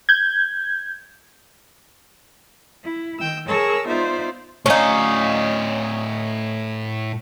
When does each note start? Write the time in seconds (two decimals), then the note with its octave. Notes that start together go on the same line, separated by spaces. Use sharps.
0.09 G6 G#6
2.84 E4
3.19 D#3 G5 E6
3.48 G#4 A#4 C#5 A5 C#6 E6
3.87 B3 D#4 F4 C5 D5 E5
4.66 A2 C#4 D#4 F5